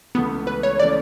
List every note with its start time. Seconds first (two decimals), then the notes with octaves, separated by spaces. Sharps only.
0.15 C#2 C#3 E3 A3 B3
0.47 B4
0.63 C#5
0.79 C#3 E3 A3 D5